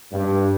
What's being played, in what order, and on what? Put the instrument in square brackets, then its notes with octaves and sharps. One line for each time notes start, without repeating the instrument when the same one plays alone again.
[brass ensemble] G2